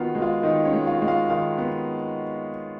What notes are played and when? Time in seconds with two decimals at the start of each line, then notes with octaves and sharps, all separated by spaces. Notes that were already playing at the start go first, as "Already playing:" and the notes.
Already playing: D#3 B3 F4 F#4 F5
0.15 G#3
0.22 F4 F5
0.43 D#3 D#4 D#5
0.65 C#4 C#5
0.73 G#3
0.87 F4 F5
1.02 G#3
1.08 F4 F5
1.30 D#3 F4 F5
1.58 B3